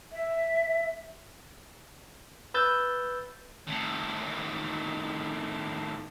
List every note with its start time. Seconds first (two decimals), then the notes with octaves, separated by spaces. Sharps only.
0.12 E5
2.54 B4 E6 G6 A6
3.67 A2 D#3